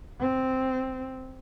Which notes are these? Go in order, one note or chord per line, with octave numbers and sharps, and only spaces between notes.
C4